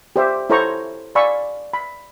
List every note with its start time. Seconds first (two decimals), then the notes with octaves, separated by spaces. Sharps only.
0.16 G4 C5 E5
0.50 E4 A4 C5 C#5 A#5 C#6
1.15 D5 F5 G#5 B5 C#6 E6
1.74 B5